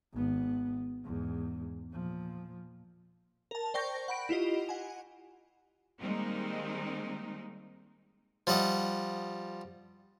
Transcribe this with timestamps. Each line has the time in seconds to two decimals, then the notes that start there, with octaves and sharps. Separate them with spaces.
0.14 G#1 B3
1.04 E2 G#2
1.92 A#2 F3
3.51 A#4 A5
3.74 C5 D5 G5 C#6 G6 A#6
4.08 F#5 B5 D7
4.29 E4 F4 G4 D#5
4.69 F#5 G#5
5.98 D#3 G3 G#3 A#3 C4 D#4
8.47 F3 G3 D#5 F#5